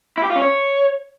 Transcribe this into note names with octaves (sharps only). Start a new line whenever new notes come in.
E4
G4
F4
C#4
C#5